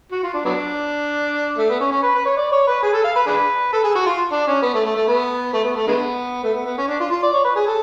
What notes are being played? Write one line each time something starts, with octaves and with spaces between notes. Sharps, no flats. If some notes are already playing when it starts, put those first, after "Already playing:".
F#4
F4
D4
F#3 B3 D4
A3
B3
C#4
C#4
B4
B4
C#5
D5
C#5
B4
G#4
A4
F5
B4
D4 G#4 B4
A4
G#4
F#4
F4
D4
C#4
B3
A3
A3
A3
B3
A3
B3
A3
D3 G#3 B3
A3
B3
B3
C#4
D4
F4
F4
D5
C#5
B4
G#4
A4